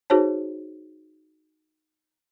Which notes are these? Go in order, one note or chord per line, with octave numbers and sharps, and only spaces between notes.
D#4 F#4 G#4 C5 C#5 A5